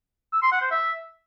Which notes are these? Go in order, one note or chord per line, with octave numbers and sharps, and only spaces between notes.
E6
C6
F#5
C5
E5